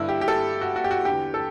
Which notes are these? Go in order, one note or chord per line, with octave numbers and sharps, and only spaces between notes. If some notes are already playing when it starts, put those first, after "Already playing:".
Already playing: G2 D3 E4
G4
G4
A4
F#4
F#4
G4
F#4
E2 D3 G4
A4